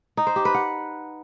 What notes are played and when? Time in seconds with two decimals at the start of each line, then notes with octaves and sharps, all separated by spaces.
0.17 D#4
0.27 C5
0.36 G4
0.45 B4
0.54 F#5